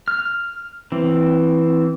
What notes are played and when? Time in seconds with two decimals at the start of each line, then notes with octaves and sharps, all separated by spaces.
0.08 F6
0.92 E3 C4